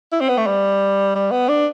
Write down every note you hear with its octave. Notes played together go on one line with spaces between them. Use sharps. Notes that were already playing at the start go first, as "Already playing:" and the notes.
E4
C4
B3
A3
G3
G3
B3
D4